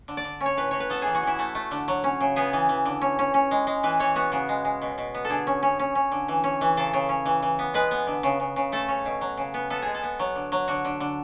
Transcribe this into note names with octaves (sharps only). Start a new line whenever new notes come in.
D3
D5
D3
C#4
C#5
A2 B4
A2 C#5
B4
B3 A4
E3 G#4
F#4
E3 E4
A3 F#4
A3
D3
F#3
C#4
C#3
B3 G#4
E3
E3
D3
C#4
C#4
C#4
G#3
G#3
E3 B4
E3 C#5
B3 F#4
C#3 F#4
G#3
G#3
B2
B2
B3
A4
D3 G#4
C#4
C#4
C#4
C#4
D3
E3
C#4
E3
C#3 A4
C#3
C#4
E3
E3
B3
G#3 B4
B3
D3
C#3
C#3
C#3
A3 A4
C#4
B2
F#3
C#3
B3
B3 A4
G#3 G#4
A4
B3
F#3
D3
F#3
D3 F#4
D3
D3